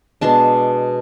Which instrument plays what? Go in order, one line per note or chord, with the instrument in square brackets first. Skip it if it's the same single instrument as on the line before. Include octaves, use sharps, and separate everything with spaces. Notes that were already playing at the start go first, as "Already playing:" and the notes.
[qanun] B2 G#3 D4 A5